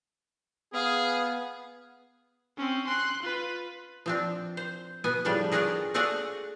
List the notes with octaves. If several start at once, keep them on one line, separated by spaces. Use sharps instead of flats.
B3 G#4 F5 G#5
C4 C#4
C6 F#6
F4 B4
F3 C4 D4
C5
B2 B3 G#5
A2 C#3 F3 G3 D4
C#4 D4 F4 F#4 G#4 A#4
A3 D4 F#4 G#4 F5 F#5